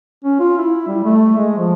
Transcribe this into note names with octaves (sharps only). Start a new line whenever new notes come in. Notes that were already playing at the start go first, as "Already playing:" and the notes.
C#4
F4
E4
G3
A3
G#3
F3